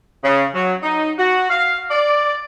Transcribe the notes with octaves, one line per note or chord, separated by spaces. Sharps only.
C#3
F#3
D#4
F#4
F5
D5